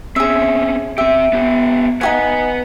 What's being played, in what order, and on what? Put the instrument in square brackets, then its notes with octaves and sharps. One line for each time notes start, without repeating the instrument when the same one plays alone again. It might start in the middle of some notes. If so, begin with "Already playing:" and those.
[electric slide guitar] C4 C#4 [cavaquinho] G#4 E5
[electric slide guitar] C4 G4 [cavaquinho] E5
[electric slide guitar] B3 G4
[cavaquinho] D#4 F#4 G#5 [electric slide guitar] B4 F#5